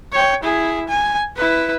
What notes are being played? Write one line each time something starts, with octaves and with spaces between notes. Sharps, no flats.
C#5 G5
E4 G#4
G#5
E4 B4